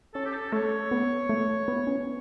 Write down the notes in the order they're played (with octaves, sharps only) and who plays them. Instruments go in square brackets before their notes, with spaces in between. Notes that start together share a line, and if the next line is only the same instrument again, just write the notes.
[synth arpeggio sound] C#4 [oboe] A4
[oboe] G4
A4
[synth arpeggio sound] A3 [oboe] C#5
[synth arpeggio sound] B3
A3
B3
C#4